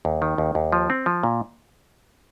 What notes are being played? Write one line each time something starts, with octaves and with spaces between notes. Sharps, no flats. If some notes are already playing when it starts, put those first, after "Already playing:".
D#2
D#3
D#2
D#2
F3
C4
F3
A#2